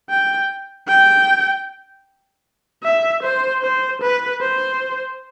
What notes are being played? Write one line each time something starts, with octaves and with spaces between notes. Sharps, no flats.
G5
G5
E5
C5
C5
B4
C5